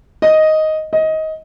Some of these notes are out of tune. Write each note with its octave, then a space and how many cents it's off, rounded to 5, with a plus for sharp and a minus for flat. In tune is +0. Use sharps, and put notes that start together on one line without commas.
D#5 +5
D#5 +20